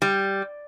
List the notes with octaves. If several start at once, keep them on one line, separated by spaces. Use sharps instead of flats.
G3